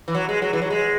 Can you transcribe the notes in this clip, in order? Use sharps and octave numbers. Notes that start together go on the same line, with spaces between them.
E3
F#3
G#3
F#3
E3
F#3
G#3